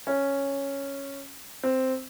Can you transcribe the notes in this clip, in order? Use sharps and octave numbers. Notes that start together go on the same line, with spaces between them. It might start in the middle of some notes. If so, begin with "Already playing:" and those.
C#4
C4